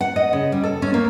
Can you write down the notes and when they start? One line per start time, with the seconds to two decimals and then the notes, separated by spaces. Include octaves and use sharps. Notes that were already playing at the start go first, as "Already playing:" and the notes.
0.01 F#5
0.16 D#5
0.33 C#3
0.52 G3
0.63 A4
0.82 C#4
0.94 A#3